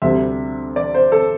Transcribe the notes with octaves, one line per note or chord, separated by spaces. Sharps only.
D2 C3 G3 E5
D5
C5
A4